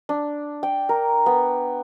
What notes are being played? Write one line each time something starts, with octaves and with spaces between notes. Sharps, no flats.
D4
G5
A#4
B3